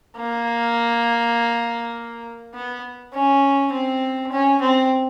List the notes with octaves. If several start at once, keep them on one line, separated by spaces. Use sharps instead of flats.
A#3
B3
C#4
C4
C#4
C4